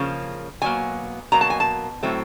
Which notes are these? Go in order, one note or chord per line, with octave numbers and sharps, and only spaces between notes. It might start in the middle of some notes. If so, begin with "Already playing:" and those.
Already playing: C#3 F3 A#3
B2 F#3 A#3 G#5
B2 F#3 A#3 A#5
A5
G#5
A5
A2 F#3 A3 C4